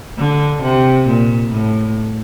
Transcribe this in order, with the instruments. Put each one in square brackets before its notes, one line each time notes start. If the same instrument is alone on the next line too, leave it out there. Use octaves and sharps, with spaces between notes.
[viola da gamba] D3
C3
A#2
A2